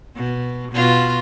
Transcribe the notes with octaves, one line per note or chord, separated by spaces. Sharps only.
B2
B2 F4